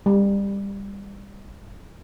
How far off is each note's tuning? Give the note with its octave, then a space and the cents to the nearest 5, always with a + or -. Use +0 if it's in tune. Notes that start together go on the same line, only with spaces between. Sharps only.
G3 +25